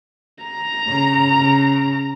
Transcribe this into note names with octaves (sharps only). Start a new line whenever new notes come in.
A#5
C#3
C#3